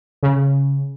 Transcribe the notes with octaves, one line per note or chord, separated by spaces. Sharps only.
C#3